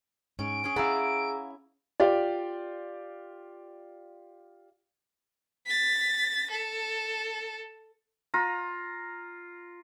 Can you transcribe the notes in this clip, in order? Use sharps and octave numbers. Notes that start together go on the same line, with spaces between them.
G#2 C#4 D7
C#4 G#4
E4 G#4 F5 F#5 A#5 E6
F4 G4 D5
A6 B6
A4
F4 A#5